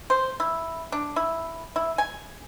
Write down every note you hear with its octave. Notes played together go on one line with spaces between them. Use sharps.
C5
E4
D4
E4
E4
G#5